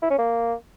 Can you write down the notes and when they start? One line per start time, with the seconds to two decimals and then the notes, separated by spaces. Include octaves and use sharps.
0.02 E4
0.10 C#4
0.18 A#3